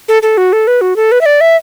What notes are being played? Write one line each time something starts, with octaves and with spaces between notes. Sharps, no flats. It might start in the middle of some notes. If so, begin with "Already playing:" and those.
A4
A4
F#4
A4
B4
F#4
A4
B4
E5
D5
E5